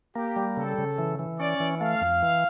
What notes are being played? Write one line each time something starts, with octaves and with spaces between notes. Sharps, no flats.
A#3 G4
G3
C#3 A4
C#3
E3
E3
C#4 D5
E3
A3 F5
F2
E3